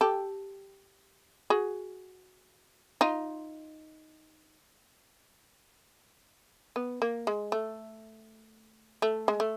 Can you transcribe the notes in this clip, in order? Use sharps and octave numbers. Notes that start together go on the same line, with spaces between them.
G4 A4
F#4 G#4
D#4 F4
B3
A#3
G#3
A3
A3
G#3
A3